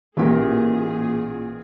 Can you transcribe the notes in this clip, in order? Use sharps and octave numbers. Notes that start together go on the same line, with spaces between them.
A1 A#2 E3 G4 G#4 A#4